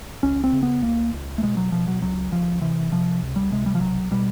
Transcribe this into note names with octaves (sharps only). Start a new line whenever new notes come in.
C#2 C#4
C4
C#3
B3
C#2 A#3
C#2
A3
B2 G#3
F#3
B2 F3
F#3
C#2 F#3
C#2 F3
C3 E3
C3 F3
C#2
G3
C3 G#3
G3
F3
B1 F#3
B2 G3